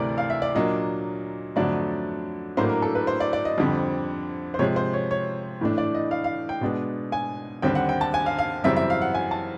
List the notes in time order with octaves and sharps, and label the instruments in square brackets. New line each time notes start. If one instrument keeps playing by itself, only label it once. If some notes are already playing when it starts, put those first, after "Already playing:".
Already playing: [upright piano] D2 C3 E3 A3 A#4 D5
F5
E5
D5
A#2 F#3 A#3 D4 D#5
F2 D3 F#3 A3 D5
A2 F#3 A#3 D4 C5
A#4
A4
B4
C5
D5
D5
D#5
F2 D3 G3 C4
C5
C3 F3 G#3 C#5
C5
C#5
C#5
A2 E3 A3 D4
D5
D#5
F5
F5
G5
B2 G#3 B3 D4
G#5
D#2 D3 G3 C4 G5
F#5
G5
A5
G#5
F5
F5
F#2 C#3 E3 G3 C4 E5
E5
F5
F#5
G#5
A5